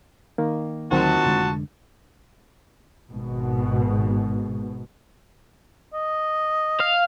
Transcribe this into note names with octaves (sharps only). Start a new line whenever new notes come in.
D#3 A#3
D2 A#2 D#3 F#3 C4 F#4 A5
F1 D3 G#3
G#1 G#2 B2
D#5
F5